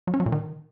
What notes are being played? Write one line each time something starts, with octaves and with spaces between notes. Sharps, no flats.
F#3
C#4
F#3
A#2
D#3